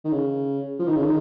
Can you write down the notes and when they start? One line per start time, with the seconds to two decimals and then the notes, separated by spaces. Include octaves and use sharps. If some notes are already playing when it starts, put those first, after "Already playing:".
0.05 D#3
0.12 C#3
0.79 F3
0.87 D#3
0.96 C#3
1.04 D#3